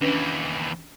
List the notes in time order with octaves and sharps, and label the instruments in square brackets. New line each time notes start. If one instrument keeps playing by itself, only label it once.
[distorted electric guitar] D#2 E3 [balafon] C#4 D4 B4